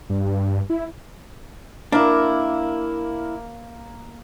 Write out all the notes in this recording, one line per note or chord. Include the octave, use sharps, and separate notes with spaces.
G2
E4
A#3 D4 E4 A#4